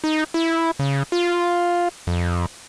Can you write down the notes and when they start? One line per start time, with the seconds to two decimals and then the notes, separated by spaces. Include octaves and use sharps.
0.04 D#4
0.34 E4
0.79 C#3
1.12 F4
2.07 F2